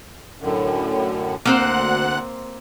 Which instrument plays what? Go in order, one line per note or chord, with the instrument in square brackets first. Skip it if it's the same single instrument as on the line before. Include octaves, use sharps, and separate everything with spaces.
[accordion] F#2 A2 D3
[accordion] D2 F#5 F#6 [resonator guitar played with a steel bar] A#3 C4 C5